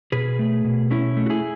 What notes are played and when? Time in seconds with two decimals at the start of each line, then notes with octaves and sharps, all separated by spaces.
0.12 B2 G#4 B4
0.39 A3
0.65 B2
0.91 A3 C#4 E4
1.17 A3
1.26 F#4
1.30 E4 G#4